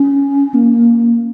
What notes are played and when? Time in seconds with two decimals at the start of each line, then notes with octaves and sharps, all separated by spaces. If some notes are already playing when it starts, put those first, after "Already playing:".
Already playing: C#4
0.54 A#3